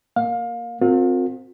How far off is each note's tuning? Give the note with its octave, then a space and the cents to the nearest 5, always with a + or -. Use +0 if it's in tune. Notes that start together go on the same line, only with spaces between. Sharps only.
A#3 +0 F5 +25
C4 +0 F4 +40 A#4 -40